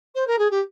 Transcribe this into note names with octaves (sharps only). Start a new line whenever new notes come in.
C5
A#4
G#4
G4